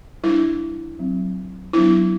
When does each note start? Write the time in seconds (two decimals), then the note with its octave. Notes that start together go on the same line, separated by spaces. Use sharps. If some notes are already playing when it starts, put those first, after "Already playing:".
0.24 G3 D4 E4
0.99 F#3 C4
1.73 F#3 B3 D4 E4